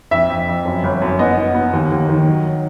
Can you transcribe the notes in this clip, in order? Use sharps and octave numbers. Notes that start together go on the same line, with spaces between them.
F2 E5
F2
F2
F#2
G1
F#2
B3 D#5
B3
B3
D#2
D#2
D#3
F#3